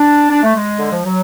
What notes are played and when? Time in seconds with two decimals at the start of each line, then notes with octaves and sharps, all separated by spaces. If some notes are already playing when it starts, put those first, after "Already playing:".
Already playing: D4
0.30 D4
0.43 A3
0.55 G#3
0.78 D3
0.91 F3
1.04 F#3